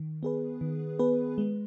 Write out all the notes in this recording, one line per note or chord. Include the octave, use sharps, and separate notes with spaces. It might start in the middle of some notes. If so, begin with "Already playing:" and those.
Already playing: D#3
B3 G#4 B4
D#3
B3 G#4 B4
G#3